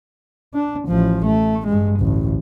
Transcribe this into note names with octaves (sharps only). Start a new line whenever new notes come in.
D4
A1 F3
A3
G2 G#3
A1 D2